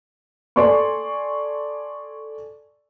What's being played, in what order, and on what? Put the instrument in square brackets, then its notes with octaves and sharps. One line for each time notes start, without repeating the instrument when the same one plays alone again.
[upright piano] A4 D5 G#5 C6 C#6